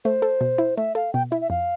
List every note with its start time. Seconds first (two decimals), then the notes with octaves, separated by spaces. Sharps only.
0.05 A3 C5
0.22 A4
0.41 B2
0.58 E4
0.77 A3 E5
0.95 A4 F5
1.13 B2 G5
1.31 E4 E5
1.41 E5
1.50 F2 F5